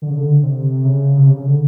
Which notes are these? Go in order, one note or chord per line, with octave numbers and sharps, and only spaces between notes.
D3
C#3
D3
C3
C#3
C3
C#3
C#3
D3